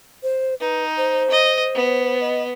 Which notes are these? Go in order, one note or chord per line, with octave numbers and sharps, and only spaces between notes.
C5
D#4 B4
C5
D#5
B3
D#5